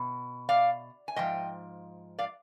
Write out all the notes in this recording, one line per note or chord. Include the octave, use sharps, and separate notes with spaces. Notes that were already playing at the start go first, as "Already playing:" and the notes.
Already playing: B2
D5 F5
G#5
G#2 F3 D#5 G5
D5 F5